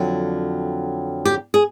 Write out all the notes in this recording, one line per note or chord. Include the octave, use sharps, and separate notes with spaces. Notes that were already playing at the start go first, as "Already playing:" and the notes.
Already playing: F2 D3 F#3
G4
G#4